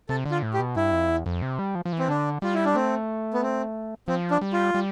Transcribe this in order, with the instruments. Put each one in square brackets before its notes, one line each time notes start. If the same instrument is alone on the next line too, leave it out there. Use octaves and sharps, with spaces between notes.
[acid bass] C3 [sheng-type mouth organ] A4
[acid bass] D3
[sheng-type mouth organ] F4
[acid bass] A2
[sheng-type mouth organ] G4
[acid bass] B2
[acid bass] G2 [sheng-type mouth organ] E4
[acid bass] F2
E2
F2
C3
G3
F3
F3
E3
[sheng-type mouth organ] C4
[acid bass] D3 [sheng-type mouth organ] D4
[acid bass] G3 [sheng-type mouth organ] F4
[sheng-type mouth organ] E4
D4
[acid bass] A3 [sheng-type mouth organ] C4
[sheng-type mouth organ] B3
C4
[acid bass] F3 [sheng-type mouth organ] C4
[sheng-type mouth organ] D4
[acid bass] G3
[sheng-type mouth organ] F4
[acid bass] G3